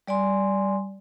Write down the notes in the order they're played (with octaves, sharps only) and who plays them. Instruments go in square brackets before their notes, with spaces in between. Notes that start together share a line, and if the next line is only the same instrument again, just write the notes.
[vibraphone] G3 D5 G#5 C6